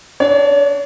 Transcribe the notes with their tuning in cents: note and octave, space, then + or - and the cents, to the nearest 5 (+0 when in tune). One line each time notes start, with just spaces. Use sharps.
D4 +0 C#5 +35